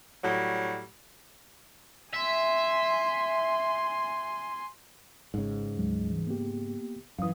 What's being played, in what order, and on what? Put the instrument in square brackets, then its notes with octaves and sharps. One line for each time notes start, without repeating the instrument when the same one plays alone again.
[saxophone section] A2 F#3 G3
[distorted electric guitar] E5 [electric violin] G#5 C6
[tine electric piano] G#1 [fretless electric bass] G#2 C#3
[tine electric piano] D2 F#3 G#3
E3 G3
A#3 B3 G4
[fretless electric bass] F#2 E3 [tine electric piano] F5 D#6